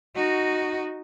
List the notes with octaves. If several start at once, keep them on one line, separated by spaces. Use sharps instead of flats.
D#4 F#4